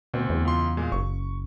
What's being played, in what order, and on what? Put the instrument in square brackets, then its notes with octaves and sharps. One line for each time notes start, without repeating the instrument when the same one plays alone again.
[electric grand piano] D2 C4 [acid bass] B2
[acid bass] E2
[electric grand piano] C#2 F4 C6
A#2 G#3
[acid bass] F#1 [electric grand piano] C#6